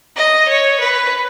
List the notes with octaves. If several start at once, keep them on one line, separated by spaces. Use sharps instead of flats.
D#5
C#5
B4